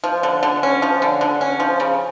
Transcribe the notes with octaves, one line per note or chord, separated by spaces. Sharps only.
F3
D3
D3
C#4
F3
D3
D3
C#4
F3
C#3